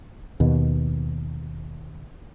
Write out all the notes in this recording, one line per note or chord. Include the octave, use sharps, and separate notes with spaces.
D#2 B2